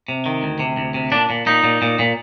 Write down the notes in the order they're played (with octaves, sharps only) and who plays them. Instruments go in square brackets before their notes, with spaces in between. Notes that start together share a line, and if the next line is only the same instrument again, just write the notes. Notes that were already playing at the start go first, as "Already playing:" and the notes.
[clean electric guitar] C3
D#3
D2
C3
D2
C3
A#2 D4
A#2
A#2 D#4
A#2
A#2
A#2